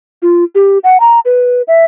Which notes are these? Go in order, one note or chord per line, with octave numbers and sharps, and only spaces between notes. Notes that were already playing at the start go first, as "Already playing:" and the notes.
F4
G4
F#5
A#5
B4
E5